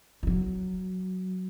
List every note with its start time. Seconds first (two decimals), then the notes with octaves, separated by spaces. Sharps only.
0.23 F3
0.27 F#3